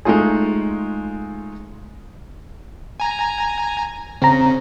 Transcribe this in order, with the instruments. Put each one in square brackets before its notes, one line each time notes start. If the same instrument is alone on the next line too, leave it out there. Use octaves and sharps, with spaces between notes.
[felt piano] G#3 A3 D#4 F4 G#4
[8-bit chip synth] G#5 A#5
[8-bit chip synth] C#3 [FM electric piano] C4 A#5